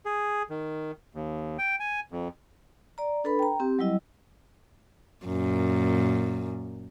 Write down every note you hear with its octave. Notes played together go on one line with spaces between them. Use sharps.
G#4
D#3
D#2
G5
G#5
F2
D5 A#5
D4 A4 B4 B5
G5 A#5
C4 G4
F#3 G3 E4 D#5
F#2 A#2